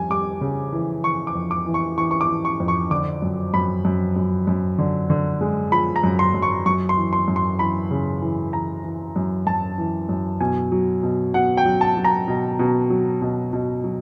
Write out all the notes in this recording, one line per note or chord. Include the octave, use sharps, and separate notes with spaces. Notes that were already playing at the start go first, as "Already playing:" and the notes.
Already playing: F2 G3 G#5
G3 D6
C#3
E3
E3 C#6
D6
F2
D6
E3
C#6
E3 C#6
C#6
D6
E3
C#6
F2
C#6
D3 D6
F#2
F#2 B5
F#2
F#2
F#2
D3
D3
G#3
F3 B5
A#5
F#2
C6
F#2
C#6
F#2 C#6
C6
E3
C6
F#2
C6
E3 B5
C#3
E3
E3 A#5
E3
F#2
F#2 A5
E3
F#2
B2 G#5
F#3
B2
B2 F#5
G5
F#3
A5
F#3
A#5
B2
B2
F#3
B2
B2
F#3